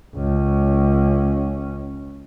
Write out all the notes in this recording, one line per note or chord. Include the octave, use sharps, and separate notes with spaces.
C#2 C#4